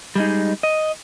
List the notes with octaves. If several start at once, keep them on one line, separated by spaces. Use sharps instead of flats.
G3 G#3 D#4
D#5